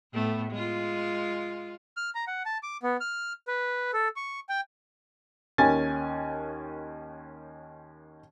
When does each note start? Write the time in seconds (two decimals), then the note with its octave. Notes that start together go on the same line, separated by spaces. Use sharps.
0.13 A2 A3 B3
0.51 G#3 F4
1.97 F6
2.15 A#5
2.27 F#5
2.45 A5
2.63 D6
2.83 B3
3.00 F6
3.48 B4
3.93 A4
4.16 C#6
4.49 G5
5.58 D#2 D#3 C#4 G#5 A6